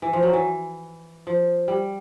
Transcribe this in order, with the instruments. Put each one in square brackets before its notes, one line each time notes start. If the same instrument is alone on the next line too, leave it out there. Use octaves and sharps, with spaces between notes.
[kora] E3
F3
F#3
E3
F3
G3